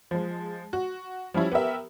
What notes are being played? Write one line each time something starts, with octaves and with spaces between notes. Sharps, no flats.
F3 G#3
F#4
F3 G3 C#4 E4
B3 G4 A#4 E5